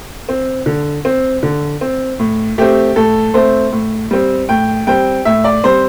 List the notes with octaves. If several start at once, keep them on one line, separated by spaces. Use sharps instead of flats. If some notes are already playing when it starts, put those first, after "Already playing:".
C4
D3
C4
D3
C4
A2
A3 C4 G4
A2 A4
A3 C4 C5
A2
G3 C4
A2 G5
G3 C4 G5
A2 E5
D5
G3 C4 C5